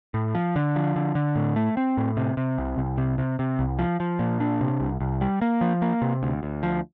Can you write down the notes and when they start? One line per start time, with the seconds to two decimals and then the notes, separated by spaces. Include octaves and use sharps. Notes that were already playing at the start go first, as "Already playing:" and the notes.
0.14 A2
0.35 F3
0.56 D3
0.76 F3
0.96 D3
1.15 D3
1.36 A2
1.56 A3
1.77 C4
1.97 A2
2.17 C3
2.37 C3
2.58 C2
2.78 C2
2.98 C3
3.18 C3
3.39 C3
3.59 C2
3.79 F3
4.00 F3
4.19 A#2
4.40 D4
4.61 C3
4.81 C2
5.00 C2
5.21 G3
5.42 A#3
5.61 F3
5.82 A#3
6.02 C3
6.23 D2
6.43 D2
6.63 F3